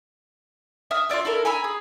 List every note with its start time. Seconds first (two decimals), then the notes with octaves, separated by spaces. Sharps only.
0.91 E5 D#6 F6
1.09 F4 G#4 D5 E5
1.25 E4 A4 A#4
1.45 G#5 A#5 B5 E6
1.64 G#4